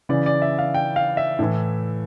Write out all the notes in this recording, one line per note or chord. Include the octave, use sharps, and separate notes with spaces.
C#3 E3 D5
D5
E5
F5
G5
F5
E5
A2 E3